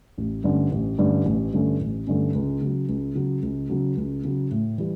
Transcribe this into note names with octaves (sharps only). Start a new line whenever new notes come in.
A1
G2 D3 A3 C#4
A1
G2 D3 A3 C#4
A1
G2 D3 A3 C#4
A1
G2 D3 A3 C#4
C#2
C#3 F#3
C#2
C#3 F#3
C#2
C#3 F#3
C#2
C#3 F#3
A2
E3 G3